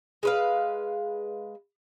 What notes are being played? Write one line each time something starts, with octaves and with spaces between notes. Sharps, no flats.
G#3 B4 F5